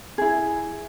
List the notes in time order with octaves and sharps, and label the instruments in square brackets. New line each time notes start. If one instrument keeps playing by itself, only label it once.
[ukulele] E4 G#4